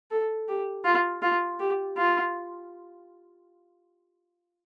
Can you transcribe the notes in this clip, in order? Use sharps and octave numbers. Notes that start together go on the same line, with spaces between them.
A4
G4
F4
F4
G4
F4